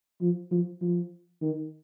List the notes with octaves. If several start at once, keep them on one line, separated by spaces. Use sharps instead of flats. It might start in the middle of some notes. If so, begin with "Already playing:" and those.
F3
F3
F3
D#3